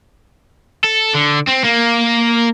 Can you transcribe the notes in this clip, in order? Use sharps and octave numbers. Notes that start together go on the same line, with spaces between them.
A4
D3
C4
A#3